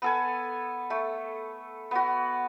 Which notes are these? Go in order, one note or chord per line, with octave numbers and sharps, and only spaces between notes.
B3 A4 G#5
A3
B3 F#4